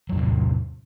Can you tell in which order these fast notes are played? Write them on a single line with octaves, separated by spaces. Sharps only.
F#3 E2 A2 C3